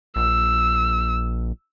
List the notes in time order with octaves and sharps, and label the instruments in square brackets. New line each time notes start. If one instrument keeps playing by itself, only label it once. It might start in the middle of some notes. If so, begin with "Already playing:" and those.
[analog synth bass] A#1 [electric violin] E6